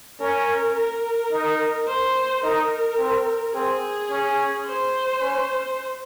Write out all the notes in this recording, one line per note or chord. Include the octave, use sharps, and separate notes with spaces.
C#4 A#4
A#4
D#4
C5
D#4 A#4
C4
C4 G#4
C#4
C5
C#4